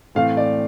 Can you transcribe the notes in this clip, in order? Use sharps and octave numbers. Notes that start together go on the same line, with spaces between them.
A2 E3 A3 C4 F5
D5